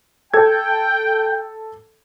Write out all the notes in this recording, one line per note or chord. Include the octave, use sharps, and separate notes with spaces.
A4 G5 G#6